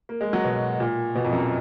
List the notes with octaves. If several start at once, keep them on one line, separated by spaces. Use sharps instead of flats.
A#3
G#3
F#3
B2
A#2
B2
F2
F#2